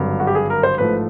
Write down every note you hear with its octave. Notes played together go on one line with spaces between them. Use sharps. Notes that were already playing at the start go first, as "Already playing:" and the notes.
Already playing: G#1 G2 D3 F#3
F#4
G4
G#4
A#4
C5
A1 G#2 F3 A3 B4